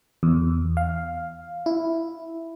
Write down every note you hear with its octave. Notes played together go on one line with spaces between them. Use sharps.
E2
F5
E4